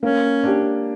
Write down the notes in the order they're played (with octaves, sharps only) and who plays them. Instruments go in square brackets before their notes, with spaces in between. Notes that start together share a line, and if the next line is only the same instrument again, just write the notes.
[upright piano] A#3 [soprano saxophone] C#4
[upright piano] D4 G4